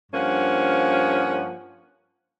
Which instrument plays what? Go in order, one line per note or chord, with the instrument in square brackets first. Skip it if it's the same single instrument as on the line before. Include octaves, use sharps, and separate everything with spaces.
[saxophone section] G2 F3 A#3 C#4 F#5